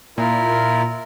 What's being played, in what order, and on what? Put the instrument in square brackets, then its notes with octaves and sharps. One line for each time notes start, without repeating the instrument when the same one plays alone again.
[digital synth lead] A#2 [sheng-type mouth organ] E4 F4 A#4